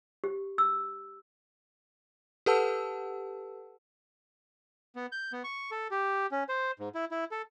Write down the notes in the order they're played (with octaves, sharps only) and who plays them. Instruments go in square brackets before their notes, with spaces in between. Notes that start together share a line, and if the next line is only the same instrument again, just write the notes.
[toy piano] G4
E6
[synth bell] G4 A4 B4 F#5 A5 E6
[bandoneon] B3
G6
B3
C#6
A4
G4
C#4
C5
G#2
E4
E4
A4